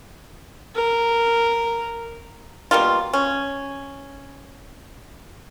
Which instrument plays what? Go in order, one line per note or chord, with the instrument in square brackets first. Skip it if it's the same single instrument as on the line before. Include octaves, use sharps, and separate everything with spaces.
[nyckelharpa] A#4
[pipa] B2 G3 A#3 F4
C#4